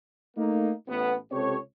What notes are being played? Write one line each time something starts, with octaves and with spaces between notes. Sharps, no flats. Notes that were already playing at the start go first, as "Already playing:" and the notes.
A3 A#3 D#4
A1 A2 B3
C#2 C3 C4 G4 A4 C#5